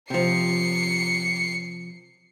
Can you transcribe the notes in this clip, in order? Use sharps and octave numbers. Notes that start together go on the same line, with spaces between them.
C3 F3 C7 C#7